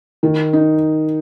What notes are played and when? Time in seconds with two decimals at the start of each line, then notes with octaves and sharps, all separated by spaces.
0.23 D#3
0.53 D#4